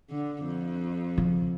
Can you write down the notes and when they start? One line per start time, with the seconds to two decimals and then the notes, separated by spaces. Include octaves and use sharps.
0.10 D3
0.45 F2
1.18 C#3 F3